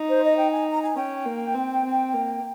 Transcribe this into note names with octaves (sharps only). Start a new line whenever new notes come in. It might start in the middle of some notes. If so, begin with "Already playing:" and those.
Already playing: D#4
C5
D#5
G5
G#5
A#5
G#5
C#4 G5
A#3
C4
C4
A#3